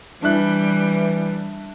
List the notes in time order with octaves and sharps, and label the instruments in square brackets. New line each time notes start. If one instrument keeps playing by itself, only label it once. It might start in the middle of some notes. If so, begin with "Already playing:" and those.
[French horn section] E3 [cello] G3 [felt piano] D4 E5 F#6